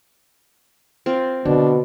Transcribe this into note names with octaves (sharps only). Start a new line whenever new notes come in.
C4 F4 A#4
B2 D3 D4